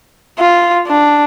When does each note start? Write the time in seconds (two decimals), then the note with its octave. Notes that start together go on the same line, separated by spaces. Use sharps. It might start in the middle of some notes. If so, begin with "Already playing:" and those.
0.39 F4
0.88 D4